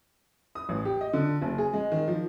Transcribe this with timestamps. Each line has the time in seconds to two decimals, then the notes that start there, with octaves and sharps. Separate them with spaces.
0.55 D#6
0.69 A1
0.85 G4
1.01 D#5
1.13 D3
1.42 F#1
1.58 G#4
1.73 G#3
1.92 D#3
2.08 F3